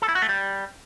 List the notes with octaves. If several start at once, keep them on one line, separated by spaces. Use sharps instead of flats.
A4
E4
F#4
A3
G3